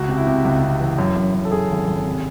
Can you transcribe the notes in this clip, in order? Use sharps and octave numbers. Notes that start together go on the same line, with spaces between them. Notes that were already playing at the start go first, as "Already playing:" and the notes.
Already playing: C#2 F#4
C3
E4
C3
C#2
C3
E3
F#2
F#2
F#2
A4
F#2 G#4
G#1
G#1
C3